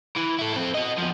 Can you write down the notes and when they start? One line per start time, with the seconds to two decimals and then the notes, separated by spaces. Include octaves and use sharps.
0.16 E3
0.39 E4 A4
0.54 C4 A4
0.74 F#4 D#5
0.98 E2 F3